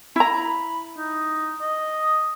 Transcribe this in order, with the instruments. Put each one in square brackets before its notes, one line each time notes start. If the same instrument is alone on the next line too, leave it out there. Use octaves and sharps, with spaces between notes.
[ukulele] E4 A#5 [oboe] B5
[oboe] D#4
D#5